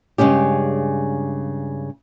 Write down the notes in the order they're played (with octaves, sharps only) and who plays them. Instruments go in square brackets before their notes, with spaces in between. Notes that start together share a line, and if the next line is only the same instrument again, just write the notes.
[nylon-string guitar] G2 C#3 G#3 C#4 G4